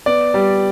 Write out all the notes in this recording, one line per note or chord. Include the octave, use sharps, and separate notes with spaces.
B3 D5
G3